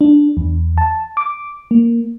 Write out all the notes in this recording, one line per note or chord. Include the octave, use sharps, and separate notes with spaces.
D4
E2
A5
D6
A#3